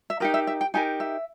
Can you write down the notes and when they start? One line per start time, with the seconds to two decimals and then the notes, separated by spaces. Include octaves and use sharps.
0.10 E5
0.20 D#4 G4 A#4 D#5
0.34 E5
0.47 E5
0.61 G5
0.74 D#4 G4 A#4 G#5
1.00 E5